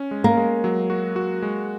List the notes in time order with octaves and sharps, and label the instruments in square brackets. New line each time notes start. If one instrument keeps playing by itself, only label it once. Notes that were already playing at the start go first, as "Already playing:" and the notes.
Already playing: [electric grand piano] C#4
G#3
[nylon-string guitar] A#3
[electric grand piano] G#3
F#3
F#4
F#4
G#3